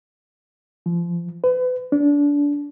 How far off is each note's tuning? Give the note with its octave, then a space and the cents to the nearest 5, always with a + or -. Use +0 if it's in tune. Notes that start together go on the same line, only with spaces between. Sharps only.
F3 -25
B4 +35
D4 -25